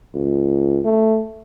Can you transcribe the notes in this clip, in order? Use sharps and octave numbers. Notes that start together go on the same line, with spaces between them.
C#2
A3